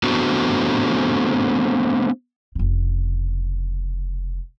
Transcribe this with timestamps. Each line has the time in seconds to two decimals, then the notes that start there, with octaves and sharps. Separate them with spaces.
0.03 A3 B3 C4 D4 F#4
2.55 F1 C#3